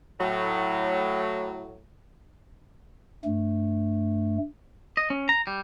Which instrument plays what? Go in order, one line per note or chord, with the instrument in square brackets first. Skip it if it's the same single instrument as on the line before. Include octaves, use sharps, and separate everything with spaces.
[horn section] A2 F#3
[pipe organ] G2 A3
[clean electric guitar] D#5
C#4
A#5
G3